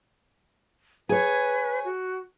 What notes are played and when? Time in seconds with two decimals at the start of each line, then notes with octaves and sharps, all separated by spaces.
1.09 G#4 B4 C#5
1.84 F#4